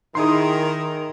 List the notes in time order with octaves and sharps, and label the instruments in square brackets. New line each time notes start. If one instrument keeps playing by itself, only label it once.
[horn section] D#3 [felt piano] D#4 E4 G#4 [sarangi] A#4 [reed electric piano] C6 D#6